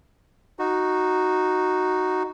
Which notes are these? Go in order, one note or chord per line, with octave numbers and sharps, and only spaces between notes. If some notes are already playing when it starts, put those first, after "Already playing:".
D#4 F#4